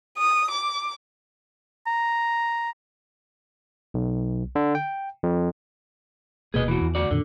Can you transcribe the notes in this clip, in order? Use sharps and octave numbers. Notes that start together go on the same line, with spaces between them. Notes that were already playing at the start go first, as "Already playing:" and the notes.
D#6
D6
A#5
B1
D3
G5
F2
D#1 B2 A#3 G#4 B4 D#5
E3 F#4
E2
D2 F#4 D5
F2 A#2 D3 D#3